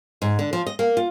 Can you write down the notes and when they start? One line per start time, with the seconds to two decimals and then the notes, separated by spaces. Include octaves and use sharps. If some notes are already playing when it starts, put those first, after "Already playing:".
0.22 G#2
0.39 D3
0.53 F3
0.66 D#5
0.79 A#3
0.97 F4